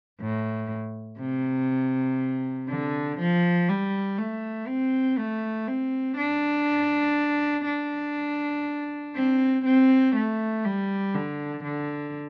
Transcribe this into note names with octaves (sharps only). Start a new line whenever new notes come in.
A2
C3
D3
F3
G3
A3
C4
A3
C4
D4
D4
C4
C4
A3
G3
D3
D3